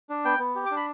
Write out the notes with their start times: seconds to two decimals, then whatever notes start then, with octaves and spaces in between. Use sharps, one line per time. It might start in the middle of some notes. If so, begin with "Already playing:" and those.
0.09 D4
0.25 B3 G5
0.39 B3
0.55 G4
0.66 D6
0.71 D4
0.77 B5